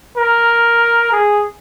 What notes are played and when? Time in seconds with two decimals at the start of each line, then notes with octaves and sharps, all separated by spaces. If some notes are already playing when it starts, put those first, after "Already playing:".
0.17 A#4
1.12 G#4